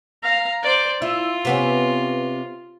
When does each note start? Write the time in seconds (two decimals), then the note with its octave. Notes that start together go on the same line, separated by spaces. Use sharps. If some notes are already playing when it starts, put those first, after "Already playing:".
0.23 F5 A#5
0.63 C5 D5
1.02 E4 F4
1.45 C3 B3 C#4